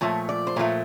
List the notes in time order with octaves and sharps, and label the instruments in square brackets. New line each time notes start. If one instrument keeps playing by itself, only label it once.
[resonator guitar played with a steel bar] A#2 F3 A3 C#5
D5
C5
A#2 F3 A3 C#5